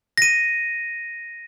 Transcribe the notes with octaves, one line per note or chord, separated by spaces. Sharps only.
A#6 D#7